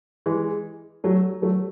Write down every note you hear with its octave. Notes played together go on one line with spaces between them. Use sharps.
E3 G#3
F#3 A3
F#3 A3